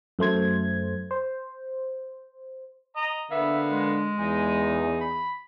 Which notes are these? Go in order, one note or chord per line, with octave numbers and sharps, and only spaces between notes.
F#2 A3 C5 G#6
C5
D#5 A#5
D3 A#3 B3 E5
G#3
E2 D#4 G#4
B5